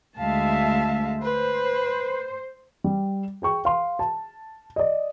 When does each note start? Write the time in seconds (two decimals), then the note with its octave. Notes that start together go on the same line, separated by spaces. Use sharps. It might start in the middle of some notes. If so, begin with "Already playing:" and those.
0.18 D2 G#3 E5 F5 A5
1.22 B4 C5
2.84 G3
3.42 G#4 G5 C#6
3.65 F5 C6
3.99 A5
4.76 D5 D#5